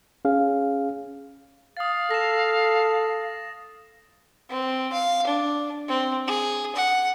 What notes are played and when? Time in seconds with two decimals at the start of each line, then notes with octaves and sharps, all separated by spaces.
0.25 C#4 G#4 F5
1.77 F5 D#6 A6
2.11 A4 A#6 E7
4.50 C4
4.93 F5
5.27 D4
5.88 C4
6.27 G#4
6.76 F#5